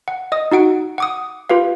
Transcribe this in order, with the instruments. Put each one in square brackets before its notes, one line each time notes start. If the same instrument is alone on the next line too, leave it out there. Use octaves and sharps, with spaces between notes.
[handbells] F#5
D#5 D#6
D#4 F#4 F#5 D7
F#5 D6 D#6
F4 G4 B4 F5